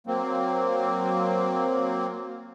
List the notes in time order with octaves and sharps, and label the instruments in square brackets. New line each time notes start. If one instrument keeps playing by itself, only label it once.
[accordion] F#3 A#3 C4